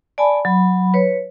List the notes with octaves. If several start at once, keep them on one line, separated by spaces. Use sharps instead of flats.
D5 G#5 A5 B5
F#3 B5
B4 C#5